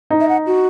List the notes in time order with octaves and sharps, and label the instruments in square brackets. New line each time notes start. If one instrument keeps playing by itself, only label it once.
[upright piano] D#4
[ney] E5
F#5
F#4